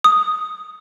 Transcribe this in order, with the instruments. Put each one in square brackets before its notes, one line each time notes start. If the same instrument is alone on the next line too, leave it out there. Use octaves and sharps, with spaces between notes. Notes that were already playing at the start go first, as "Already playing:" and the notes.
[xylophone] D#6